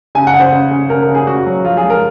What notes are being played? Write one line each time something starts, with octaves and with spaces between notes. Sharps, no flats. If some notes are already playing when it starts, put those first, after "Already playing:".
C#3 G#5
F#5
C#3
C5
C#3
C#3
C#3 A#4
A#4
C#3
G#4
C#3 F#4
F#3
F3 F4
G#4
G#3
A#4